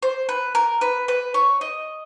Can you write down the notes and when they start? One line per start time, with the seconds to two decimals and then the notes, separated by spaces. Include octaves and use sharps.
0.03 C5
0.29 B4
0.55 A#4
0.81 B4
1.08 B4
1.34 C#5
1.61 D#5